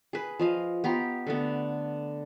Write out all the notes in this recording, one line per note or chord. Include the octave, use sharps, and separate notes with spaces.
G#4 B4
F3 D#5 F5
B3 G4 A#5 C6
D3 A3 B3